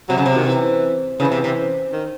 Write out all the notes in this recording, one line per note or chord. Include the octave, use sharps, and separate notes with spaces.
C3 F#3
C#3
C3
D#3
E3
C#3 E3
C3
C3
D#3